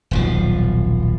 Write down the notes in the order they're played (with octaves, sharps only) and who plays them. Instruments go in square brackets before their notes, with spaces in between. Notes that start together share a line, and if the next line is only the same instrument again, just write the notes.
[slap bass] D#1 B1 F3